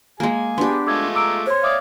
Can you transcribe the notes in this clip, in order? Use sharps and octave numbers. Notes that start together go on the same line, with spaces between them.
G#3 A#3 G#4 G#5
B3 D4 G4 B4 C6
G#3 A3 F4 D6 E6 G#6
A#5 D6 E6 D7
C5 C#5 C6
D5 E5 F5 D6 D#6